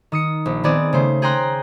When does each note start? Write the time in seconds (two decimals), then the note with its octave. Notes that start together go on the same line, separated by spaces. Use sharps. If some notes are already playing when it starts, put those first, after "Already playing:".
0.12 D#3 D#6 C#7
0.46 A#1
0.64 D#3 B3 C4 G#4 D5
0.93 C#3 A3 C5
1.22 G#4 G5 A#5 C6 F#6